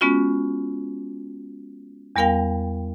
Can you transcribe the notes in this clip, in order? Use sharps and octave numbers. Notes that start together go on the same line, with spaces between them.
G#3 B3 C#4 F4 F#4
E2 G3 B3 A#4 F5 G5